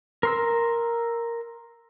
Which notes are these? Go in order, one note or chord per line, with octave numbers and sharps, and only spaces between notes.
A#4 C6 E6